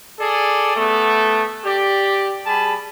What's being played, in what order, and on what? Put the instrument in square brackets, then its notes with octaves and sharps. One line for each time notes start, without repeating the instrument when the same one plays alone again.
[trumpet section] G#4 A4 D5
A3 B3
G4 D5
G3 G#4 A5 B5